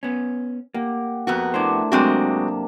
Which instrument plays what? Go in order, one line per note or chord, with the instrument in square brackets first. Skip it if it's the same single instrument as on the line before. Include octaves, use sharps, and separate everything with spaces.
[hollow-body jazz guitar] B3 C#4
[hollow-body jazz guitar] A#3 [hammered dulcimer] G4 F#5
[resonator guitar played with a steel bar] F2 B3 F#4 [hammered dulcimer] A#4
[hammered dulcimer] A3 D4 [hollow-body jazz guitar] E4 C5
[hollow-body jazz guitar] F#2 D4 [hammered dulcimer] C3 A#3 [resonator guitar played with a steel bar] G#3 C4 F#4